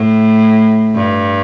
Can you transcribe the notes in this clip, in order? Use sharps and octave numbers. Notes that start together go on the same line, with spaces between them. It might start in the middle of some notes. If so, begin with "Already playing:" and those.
Already playing: A2
G2